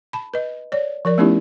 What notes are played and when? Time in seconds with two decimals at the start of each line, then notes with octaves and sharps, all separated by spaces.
0.13 A5 B5
0.34 B4 D#5
0.72 C#5 D5
1.05 F3 A#4 D5
1.18 A3 B3 C#4 D#4 E4 G4